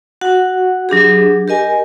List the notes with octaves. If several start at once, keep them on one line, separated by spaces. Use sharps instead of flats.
F#4 F#5
F#3 D4 G4 G#4
G4 A#4 D#5 G#5